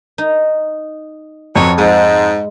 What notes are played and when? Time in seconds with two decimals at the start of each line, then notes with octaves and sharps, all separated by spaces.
0.18 D#4
1.56 F2 F#3 B3 C#5
1.78 G#2 G#3